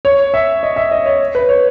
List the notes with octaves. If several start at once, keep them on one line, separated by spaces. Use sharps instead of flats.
C#5
E5
D#5
E5
D#5
C#5
B4
C#5